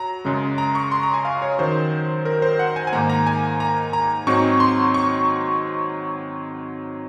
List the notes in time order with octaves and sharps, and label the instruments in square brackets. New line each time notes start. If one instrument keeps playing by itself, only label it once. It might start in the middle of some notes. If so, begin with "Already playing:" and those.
Already playing: [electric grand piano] F#3 A#5
F#2 C#3 G#3
A#5
C#6
C6
A#5
G#5
F5
C#5
F#2 D#3 F#3 C5
A#4
C5
F#5
G#5
G#5
G#2 D#3 A#3 A#5
A#5
G#5
A#5
A#5
G#2 F#3 C4 D#4 C#6
C6
C#6